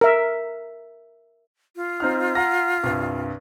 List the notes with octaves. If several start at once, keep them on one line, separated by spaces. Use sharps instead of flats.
A#4 E5
F4
C4 D#4 F6
F#5 A#5 A#6
C2 G2